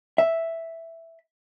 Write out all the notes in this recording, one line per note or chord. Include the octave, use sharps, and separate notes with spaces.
E5